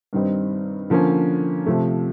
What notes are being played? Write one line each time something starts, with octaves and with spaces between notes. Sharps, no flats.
G2 D#3 G3 C4 D#4
D3 F3 A#3 C#4
C3 F3 A3